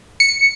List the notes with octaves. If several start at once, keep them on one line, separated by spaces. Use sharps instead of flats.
C#7